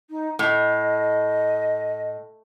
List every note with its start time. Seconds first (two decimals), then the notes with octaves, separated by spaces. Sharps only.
0.09 D#4
0.39 A2 D#5